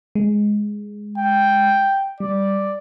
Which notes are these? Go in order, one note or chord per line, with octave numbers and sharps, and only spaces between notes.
G#3
G5
G3 D5